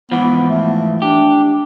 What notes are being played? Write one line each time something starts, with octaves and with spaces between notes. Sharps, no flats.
G#2 E3 F3 B3
A3
D4 G4